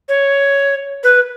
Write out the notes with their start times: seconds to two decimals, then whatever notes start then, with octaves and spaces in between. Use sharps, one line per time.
0.09 C#5
1.04 B4